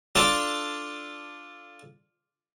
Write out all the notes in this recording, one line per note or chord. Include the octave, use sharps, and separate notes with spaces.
D4 F4 A4 D5